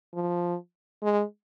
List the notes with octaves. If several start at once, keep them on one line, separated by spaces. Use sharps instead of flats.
F3
G#3